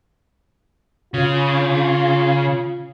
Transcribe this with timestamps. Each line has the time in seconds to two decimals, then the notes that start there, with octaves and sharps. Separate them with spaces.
1.14 C#3 F4